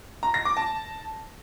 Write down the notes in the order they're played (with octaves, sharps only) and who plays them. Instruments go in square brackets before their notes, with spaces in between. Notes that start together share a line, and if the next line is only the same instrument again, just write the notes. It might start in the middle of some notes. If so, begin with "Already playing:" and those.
[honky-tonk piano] A#5
A#6
D6
A5